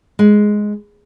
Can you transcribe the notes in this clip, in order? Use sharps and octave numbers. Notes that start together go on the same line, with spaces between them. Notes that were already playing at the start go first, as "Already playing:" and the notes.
G#3